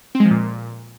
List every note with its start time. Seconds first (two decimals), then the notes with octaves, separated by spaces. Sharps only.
0.15 C4
0.20 G#3
0.25 F3
0.31 A#2